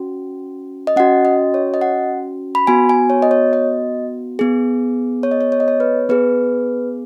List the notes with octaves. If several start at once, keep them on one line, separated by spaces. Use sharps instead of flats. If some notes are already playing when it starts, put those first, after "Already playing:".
Already playing: C#4 F#4
D#5
C#4 F#4 F#5
D#5
C#5
D#5
F#5
B5
B3 F#4 G#5
G#5
C#5
D#5
C#5
D#5
B3 G#4
C#5
D#5
C#5
C#5
D#5
C#5
B4
B3 G#4 B4